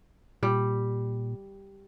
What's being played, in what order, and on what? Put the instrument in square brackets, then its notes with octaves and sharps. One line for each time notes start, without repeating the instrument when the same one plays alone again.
[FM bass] A#2 [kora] G3